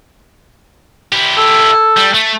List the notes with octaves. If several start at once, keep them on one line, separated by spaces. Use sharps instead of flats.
E4 G4
A4
G3
A3